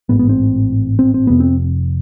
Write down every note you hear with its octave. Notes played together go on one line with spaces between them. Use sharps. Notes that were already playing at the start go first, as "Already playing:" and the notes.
A1 G#2 B3
B3
C4
C4
C4
F1 F2 C3 B3
C4